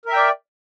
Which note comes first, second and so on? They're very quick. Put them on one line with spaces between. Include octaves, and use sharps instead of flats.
A#4 E5 G5 D5